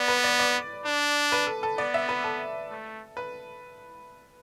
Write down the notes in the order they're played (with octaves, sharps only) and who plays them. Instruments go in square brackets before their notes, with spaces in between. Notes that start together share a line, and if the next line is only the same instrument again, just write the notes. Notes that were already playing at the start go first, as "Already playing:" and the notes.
Already playing: [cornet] B3 [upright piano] D5
[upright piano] B4
D5
D5
[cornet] D4
[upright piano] B4
A4
A4
[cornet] B3 [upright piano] D5
[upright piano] E5
B4
A4
[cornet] A3
[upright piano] B4